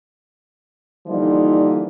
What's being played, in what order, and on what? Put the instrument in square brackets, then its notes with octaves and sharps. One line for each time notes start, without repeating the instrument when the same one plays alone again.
[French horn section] D3 E3 F3 G3 A#3 D#4